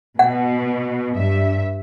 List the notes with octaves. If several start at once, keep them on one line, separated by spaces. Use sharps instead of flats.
B2 F#5
G2 E5